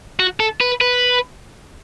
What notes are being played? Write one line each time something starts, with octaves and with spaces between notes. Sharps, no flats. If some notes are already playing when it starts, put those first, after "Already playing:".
F#4
A4
B4
B4